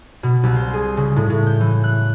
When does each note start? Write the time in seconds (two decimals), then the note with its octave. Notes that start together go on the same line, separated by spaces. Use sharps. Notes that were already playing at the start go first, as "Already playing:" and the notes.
0.23 B2
0.43 C2
0.56 C5
0.74 G#4
0.97 C#3
1.16 A2
1.30 A2
1.47 G6
1.61 E3
1.84 F#6